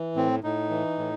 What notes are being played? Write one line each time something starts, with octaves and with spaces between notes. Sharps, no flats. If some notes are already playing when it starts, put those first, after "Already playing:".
Already playing: E3
A2 C4
A2 D#4
E3
A2